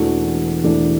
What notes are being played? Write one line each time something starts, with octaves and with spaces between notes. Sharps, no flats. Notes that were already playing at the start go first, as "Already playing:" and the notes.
Already playing: E1 E2 E3 A3 D4 F#4
E1 E2 E3 A3 D4